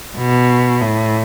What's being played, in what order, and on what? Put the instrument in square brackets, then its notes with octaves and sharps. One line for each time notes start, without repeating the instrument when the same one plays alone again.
[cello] B2
A2